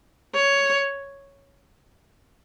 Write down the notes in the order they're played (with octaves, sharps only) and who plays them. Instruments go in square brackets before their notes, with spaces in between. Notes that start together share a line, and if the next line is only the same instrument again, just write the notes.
[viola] C#5